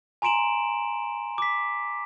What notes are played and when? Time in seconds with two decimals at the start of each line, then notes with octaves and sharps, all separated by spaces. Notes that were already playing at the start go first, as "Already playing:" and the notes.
0.22 G#5 A#5 C6 D7 E7 F#7
1.38 D6 B6